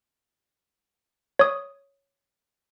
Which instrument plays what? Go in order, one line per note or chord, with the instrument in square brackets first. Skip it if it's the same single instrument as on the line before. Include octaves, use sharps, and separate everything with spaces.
[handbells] C#5 D#6